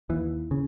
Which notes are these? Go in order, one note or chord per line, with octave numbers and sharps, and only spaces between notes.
D#2 E3
C#3